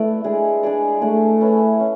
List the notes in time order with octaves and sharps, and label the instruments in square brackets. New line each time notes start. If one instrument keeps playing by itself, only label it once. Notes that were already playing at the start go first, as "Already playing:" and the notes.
Already playing: [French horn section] A3 [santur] E4 B4 D5 E5
[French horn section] G#3 [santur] D4 G#4 D5
[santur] D4 G#4 D5
[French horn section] A3 [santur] D4 G#4 D5
[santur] C#4 E4 B4
C#4